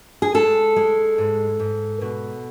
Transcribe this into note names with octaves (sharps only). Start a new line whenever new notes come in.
G#4
G#3 A4
G#3
G#2
G#2
B2